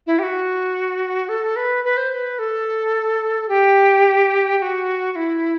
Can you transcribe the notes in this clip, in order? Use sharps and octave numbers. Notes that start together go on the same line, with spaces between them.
E4
G4
F#4
A4
B4
B4
C5
C5
B4
A4
G4
G4
F#4
F#4
E4